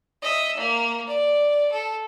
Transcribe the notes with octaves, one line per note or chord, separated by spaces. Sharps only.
D#5 E5
A#3
D5
A4